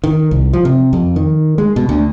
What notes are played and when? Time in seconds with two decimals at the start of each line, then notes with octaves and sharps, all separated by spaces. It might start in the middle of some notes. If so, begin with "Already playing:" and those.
0.04 D#3
0.31 C2
0.53 F3
0.65 C3
0.93 F2
1.16 D#3
1.58 G#3
1.76 B2
1.89 D2